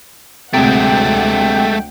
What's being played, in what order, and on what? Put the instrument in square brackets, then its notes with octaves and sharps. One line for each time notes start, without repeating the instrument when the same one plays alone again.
[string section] D2 F#5 [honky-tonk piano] C3 [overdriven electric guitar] G#3 A3 [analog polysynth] G5